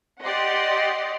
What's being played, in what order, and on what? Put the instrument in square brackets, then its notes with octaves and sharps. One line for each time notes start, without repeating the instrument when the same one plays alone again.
[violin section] G4 D5 D#5 F#5 C6